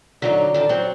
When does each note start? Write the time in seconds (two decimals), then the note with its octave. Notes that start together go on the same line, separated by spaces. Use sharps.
0.22 D3 F#3 D#4 D5
0.54 D3 D#3 A4
0.69 F#3 C4